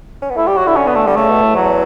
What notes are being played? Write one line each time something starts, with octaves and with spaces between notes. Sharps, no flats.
C#4
B3
A3 E4
G3 G4
F#3 F#4
D3 E4
C#4
B3
A3
D3 G3
C#3 A3
B2
A2
E2 F#3